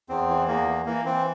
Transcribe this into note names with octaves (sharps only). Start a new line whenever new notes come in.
E2 C4
E3
E2 A#3
E3
E3 A#3
E3 C4